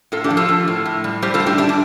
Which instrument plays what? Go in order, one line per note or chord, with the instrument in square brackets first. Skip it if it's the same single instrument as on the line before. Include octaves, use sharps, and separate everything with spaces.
[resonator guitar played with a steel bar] A2 F4 A4
D4 G4
F3
F4 A4
F3
A2
A2
G3
G3 G4 C5
F4 A4
A2
D4 G4
A2 A3 D4
D4